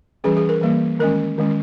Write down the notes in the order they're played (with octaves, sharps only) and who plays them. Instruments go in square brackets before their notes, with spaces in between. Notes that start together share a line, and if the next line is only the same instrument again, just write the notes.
[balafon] E3 G3 C#4 G#4
G#4
A#4
E3 G3 A#3
D#3 G#3 C#4 A#4
D#3 G#3 C#4